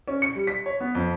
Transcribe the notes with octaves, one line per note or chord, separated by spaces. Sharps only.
C#4
C#7
G3
B6
C#5
B3
F2